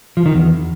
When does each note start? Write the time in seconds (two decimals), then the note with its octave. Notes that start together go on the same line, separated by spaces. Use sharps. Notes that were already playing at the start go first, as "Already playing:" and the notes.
0.17 F3
0.26 D#3
0.34 E2